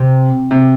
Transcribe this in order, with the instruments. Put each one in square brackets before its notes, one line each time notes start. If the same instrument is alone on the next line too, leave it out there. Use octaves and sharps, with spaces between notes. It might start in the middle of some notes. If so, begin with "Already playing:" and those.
Already playing: [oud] C3
[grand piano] C3